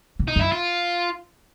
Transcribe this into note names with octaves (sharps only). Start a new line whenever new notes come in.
B2
D#4
F#2 E4
F4